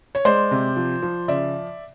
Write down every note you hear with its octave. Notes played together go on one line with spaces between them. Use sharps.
C#5
G#3 C5 D5
C3
F3
F3
C#3 D5 E5